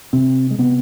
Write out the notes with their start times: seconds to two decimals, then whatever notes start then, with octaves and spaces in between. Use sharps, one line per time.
0.13 C3 C4
0.51 G#3
0.58 C3 B3